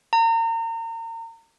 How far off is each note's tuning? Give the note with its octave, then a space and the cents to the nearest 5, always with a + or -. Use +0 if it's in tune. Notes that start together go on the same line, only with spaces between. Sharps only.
A#5 -35